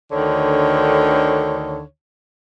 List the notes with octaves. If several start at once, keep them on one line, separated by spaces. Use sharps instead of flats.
D2 D3 D#3 C#5